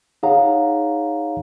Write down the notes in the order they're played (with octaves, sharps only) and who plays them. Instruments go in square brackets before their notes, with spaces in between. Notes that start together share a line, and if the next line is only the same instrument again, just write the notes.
[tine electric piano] D#4 G#4 C#5 F5 F#5 A#5